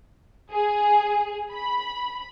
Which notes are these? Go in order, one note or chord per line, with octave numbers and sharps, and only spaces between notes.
G#4
B5